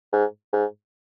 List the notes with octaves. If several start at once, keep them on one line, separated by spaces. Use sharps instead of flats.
G#2
G#2